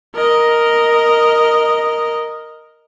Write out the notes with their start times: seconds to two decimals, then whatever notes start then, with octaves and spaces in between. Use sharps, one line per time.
0.15 A#4 D#5